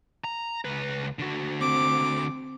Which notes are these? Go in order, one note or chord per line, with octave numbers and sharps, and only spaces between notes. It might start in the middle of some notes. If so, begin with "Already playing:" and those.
A#5
C#2 B4
D3 F#4
C4 D6